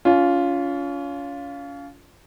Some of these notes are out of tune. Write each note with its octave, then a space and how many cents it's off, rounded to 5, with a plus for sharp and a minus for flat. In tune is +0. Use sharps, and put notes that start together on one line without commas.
C#4 +35 F4 +0